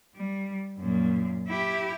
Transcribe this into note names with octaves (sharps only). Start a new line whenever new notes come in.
G3
F#2 A#2
E4 G4